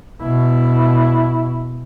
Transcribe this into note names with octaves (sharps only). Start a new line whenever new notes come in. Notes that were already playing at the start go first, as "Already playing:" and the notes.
B2 E4